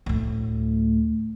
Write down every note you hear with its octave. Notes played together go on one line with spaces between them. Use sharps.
D2 A2